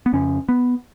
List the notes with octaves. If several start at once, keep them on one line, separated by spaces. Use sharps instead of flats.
B3
F2 C#3 C#4
B3